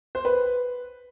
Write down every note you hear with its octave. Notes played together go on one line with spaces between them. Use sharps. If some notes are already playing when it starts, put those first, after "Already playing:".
C5
B4